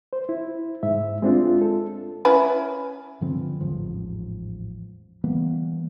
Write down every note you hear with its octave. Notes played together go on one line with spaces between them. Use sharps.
C5
E4
G#2 E5
G#3 C4 D4 F4
A4
C#4 E4 B4
G2 D3 F3 C4
A1 E2 G#2 F3
E3 G3 A#3 B3